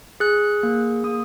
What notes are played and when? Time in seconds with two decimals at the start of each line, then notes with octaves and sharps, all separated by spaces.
0.20 G#4 F#6
0.63 A#3
1.04 A#3 D#6